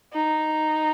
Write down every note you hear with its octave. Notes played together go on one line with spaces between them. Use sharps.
D#4